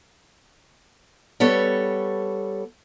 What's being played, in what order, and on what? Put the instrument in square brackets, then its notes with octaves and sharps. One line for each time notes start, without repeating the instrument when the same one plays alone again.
[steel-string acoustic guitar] G3 B3 A4 C#5